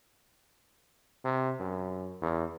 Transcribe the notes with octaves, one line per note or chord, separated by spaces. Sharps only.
C3
F#2
E2